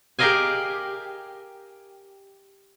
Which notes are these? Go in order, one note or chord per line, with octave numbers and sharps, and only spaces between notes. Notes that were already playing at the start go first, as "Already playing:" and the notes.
G4 G#4 A#4 D#5 F5 G#5